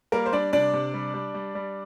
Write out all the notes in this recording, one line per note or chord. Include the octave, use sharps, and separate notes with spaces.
G3 A#3 A#4
C5
G3 D4 D5
C3 D4 D5
C3
G3
G3
G3
G3